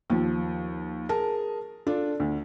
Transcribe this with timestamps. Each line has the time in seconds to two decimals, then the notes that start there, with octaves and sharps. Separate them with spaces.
0.10 D#2 F3
1.09 G#4 A#4 A5
1.87 D4 F4 A4 D5
2.20 D2